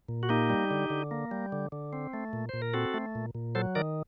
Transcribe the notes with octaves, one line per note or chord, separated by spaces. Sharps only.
A#2
F#4
A#3 D#4 G4
G3
D3
D3
A#3
G3
D3
D3
C4
A3
A#2
A#2 C5
A#4
C4 F#4 A4
A3
A#2
A#2
F#3 A4 C5
D#3 A#4 D5